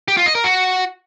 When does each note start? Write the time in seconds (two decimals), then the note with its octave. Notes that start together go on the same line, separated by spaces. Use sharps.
0.08 G4
0.17 F4
0.26 D#5
0.35 A#4
0.44 F#4